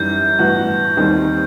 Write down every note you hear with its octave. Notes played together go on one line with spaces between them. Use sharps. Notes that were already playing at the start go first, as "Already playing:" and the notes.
Already playing: F#2 E3 G3 D#4 G6
A1 G2 E3 B3 F#4
D#2 D#3 G3 C4 D#4